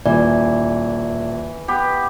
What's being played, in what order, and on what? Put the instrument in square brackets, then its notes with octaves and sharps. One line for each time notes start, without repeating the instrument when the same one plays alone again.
[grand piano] D#1 [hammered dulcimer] E3 [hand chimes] D5
[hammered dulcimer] B3 G4